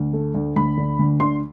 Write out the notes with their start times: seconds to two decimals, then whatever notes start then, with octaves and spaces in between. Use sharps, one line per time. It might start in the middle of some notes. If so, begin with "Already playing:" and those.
Already playing: D2
0.13 A3
0.34 D2
0.56 D2 B5
0.77 D3
0.99 D2
1.20 D3 C6